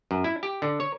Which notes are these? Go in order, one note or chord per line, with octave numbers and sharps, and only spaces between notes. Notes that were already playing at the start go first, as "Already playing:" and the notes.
F#2
E4
G4
D3
C#5